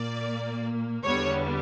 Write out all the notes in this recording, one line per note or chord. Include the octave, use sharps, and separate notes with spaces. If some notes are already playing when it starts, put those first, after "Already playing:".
Already playing: A#2 A#3 D5
E2 D3 G3 B3 C#5